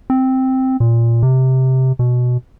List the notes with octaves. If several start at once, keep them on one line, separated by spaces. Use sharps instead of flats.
C4
A#2
C3
B2